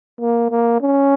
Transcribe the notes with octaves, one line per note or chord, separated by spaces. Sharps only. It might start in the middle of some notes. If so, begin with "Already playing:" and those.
A#3
A#3
C#4